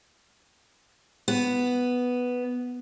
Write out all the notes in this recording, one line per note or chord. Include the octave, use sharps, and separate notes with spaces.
B3